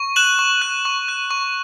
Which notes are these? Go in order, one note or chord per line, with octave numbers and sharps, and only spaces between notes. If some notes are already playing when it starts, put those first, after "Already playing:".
Already playing: C#6
F#6 E7 F#7
C#6
F#6
C#6
F#6
C#6